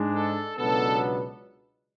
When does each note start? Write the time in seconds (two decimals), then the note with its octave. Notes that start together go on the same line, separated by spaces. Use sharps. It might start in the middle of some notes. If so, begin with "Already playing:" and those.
Already playing: G#2 G#3 D4
0.15 A4
0.57 C#2 B2 F#3 B3 D4 A4